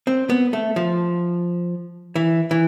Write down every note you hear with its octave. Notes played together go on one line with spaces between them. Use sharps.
C4
B3
A3
F3
E3
E3